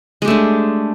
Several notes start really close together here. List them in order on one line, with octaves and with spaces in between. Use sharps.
G#3 G4 A3 D4